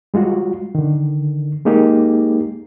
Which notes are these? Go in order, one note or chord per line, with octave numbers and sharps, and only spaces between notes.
G3 G#3 F4 F#4
D3 D#3
G#3 A#3 D#4 G4 G#4